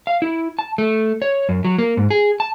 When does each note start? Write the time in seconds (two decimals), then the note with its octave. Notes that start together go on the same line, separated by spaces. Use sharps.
0.07 F5
0.22 E4
0.59 A5
0.78 A3
1.22 C#5
1.49 F#2
1.65 F#3
1.79 A#3
1.97 G#2
2.11 G#4
2.40 A5